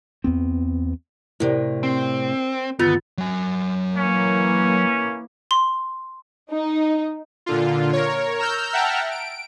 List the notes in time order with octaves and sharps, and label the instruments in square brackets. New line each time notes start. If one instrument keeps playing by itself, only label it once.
[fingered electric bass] E2 B3 C4
[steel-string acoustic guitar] A2 C3 [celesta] E4 [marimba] A#4 C5 D5
[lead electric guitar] C4
[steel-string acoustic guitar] D2 [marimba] G2 D#3 E6 [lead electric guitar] B3 [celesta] F4 A6
[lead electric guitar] F#3 G#5
[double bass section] E3 A#3 [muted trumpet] C#4
[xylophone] C6
[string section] D#4
[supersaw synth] A#2 D3 F4
A#4 C#5
A#5 E6 F6 G6
E5 F#5 G5 A5 A#5 F6
D7